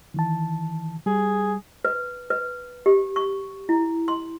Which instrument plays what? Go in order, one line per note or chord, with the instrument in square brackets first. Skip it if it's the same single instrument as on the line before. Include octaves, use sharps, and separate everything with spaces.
[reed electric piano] D#3 E3 A5
[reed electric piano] G3 [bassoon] G#4
[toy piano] B4
B4
G4
C#6
E4
C6